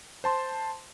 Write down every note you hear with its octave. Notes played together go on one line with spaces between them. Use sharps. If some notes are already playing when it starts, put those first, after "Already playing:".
C5 A5 C6